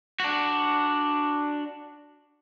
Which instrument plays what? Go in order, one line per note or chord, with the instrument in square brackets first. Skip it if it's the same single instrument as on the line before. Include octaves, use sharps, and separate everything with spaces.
[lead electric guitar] D4 F#4